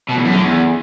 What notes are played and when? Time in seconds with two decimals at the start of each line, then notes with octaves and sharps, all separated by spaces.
0.09 B2
0.16 E2
0.24 F#2
0.32 D3
0.40 E2